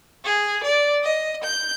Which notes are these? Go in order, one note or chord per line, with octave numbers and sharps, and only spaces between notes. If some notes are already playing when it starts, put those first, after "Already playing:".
G#4
D5
D#5
G6